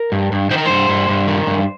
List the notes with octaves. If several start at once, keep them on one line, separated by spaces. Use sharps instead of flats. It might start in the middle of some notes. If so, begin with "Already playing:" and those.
Already playing: A#4
G2
G2
D#3 C5
A#4
G2 C5
G2
G2
D#3
G2